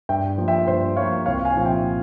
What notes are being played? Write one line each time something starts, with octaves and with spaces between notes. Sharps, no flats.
G2 E5 G5
F3 A#3
E5 G5
G2 C5 E5
F3 A#3 C#5 F5
C2 C#5 F5
F5 G#5
A#2 F3 C4
E5 G5